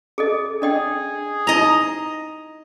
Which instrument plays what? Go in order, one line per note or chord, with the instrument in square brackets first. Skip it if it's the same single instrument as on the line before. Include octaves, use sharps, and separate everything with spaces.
[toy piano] G#4 A4 D#5
[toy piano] D4 D#5 G5 [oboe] G#4
[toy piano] D#4 E4 [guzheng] D#5 A#5